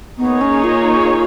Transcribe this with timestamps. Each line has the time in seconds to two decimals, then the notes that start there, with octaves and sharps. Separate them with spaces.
0.18 A#3 B3 D#4 G#4 C#5
0.41 C#4
0.64 F4